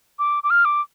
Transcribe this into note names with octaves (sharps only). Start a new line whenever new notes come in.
D6
D6
F6
D6